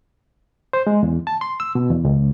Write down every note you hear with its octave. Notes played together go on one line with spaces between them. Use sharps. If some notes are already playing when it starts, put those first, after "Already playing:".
C5
G#3
E2
A5
C6
E6
B2
E2
C#2